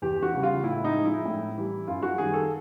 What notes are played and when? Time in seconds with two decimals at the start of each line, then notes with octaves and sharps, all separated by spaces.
0.02 E2 G4
0.22 F#4
0.33 C#3 E3 G3
0.43 F4
0.64 A2 E4
0.84 D#4
0.94 F3 G#3
1.05 E4
1.25 A2
1.57 E3 G3
1.88 F#2 F4
2.03 F#4
2.18 D#3 G3 G#4
2.34 A4